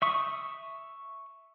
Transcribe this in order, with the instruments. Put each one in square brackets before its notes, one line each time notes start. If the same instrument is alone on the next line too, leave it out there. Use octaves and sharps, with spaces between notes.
[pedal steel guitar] E5 C#6 D#6